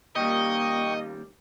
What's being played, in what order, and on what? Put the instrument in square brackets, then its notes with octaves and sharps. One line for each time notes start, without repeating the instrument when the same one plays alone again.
[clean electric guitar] D#2 G3 [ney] A#3 [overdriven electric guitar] D#5 [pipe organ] G5 C#6